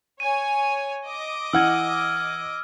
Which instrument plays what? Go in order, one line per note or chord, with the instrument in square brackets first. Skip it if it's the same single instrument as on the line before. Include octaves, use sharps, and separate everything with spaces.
[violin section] C#5 G#5 [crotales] D#7
[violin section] D#5 D6
[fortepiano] E3 F#5 [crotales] E6 F6 G#6